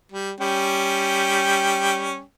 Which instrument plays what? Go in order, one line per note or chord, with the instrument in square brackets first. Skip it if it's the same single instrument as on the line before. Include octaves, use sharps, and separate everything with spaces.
[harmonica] G3
G3 C#4 G5